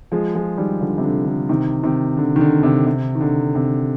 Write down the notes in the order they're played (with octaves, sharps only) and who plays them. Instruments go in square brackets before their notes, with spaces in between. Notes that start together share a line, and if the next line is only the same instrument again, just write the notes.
[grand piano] F3 G#3
F3 G#3
D#3 G3
D3 F3
C3
D3
D3
C3 D#3
C3 D#3
D3
D#3
D3
C3
C3
D#3
D3
C3